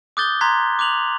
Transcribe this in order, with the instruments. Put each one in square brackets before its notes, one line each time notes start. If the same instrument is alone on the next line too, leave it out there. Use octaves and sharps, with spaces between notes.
[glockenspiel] D6 D#6 F#6 G6 A6 G7
A#5 C6 F#6 G#6 B6
D6 F#6 F7 F#7